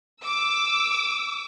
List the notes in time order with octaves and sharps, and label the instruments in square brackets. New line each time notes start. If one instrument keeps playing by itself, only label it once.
[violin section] D6 E6